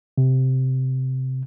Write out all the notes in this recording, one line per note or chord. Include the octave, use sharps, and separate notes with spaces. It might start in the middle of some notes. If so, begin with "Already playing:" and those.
C3